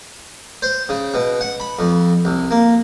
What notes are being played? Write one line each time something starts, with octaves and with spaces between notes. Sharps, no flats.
C5
C#3
B2
F#5
B5
F2
C2
A#3